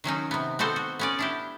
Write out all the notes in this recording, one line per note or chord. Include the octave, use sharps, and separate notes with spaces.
D#3 F#3 C#4 D#4
C3 B3
B3 C4 F#4 A4 C5
F#4
B3 C#4 D5
D4 E4 G4